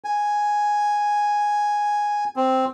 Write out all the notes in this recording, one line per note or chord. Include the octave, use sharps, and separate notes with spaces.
G#5
C4